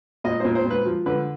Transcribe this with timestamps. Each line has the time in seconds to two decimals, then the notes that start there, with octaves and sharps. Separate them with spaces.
0.24 A#2 D#5
0.40 A#2 C5
0.55 C5
0.65 A#2 B4
0.86 F3
1.06 D3 B4